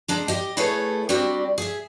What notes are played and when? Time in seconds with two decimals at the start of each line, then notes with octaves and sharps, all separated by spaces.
0.08 G#3 D4 A#5
0.28 G4 D#5
0.57 A3 E4 G#4 A4 B4 C#5
1.09 G3 C4 D4 F#4 G4
1.58 G#4 E5